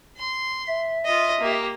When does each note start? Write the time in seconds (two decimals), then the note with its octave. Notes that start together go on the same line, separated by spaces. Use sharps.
0.17 C6
0.67 E5
1.05 F4 D#5
1.40 A#3 G4